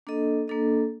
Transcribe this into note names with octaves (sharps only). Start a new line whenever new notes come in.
A#3 D4 A4 D#5
A#3 D4 A4 D#5